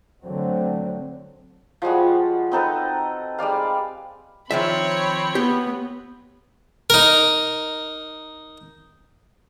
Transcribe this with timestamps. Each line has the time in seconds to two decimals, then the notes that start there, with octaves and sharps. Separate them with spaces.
0.25 D3 F#3 A3 C4
1.82 F3 G3 G#3 F#4
2.52 C4 D#4 A4 B4
3.39 G3 G#3 D5 F5
4.51 D#3 F3 C4 C#5 E5 B5
5.35 B3 G4
6.90 D#4 A#4